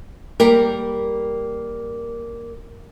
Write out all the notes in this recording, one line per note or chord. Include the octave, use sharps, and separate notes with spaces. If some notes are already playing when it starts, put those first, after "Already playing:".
G3 A#3 G4 A#4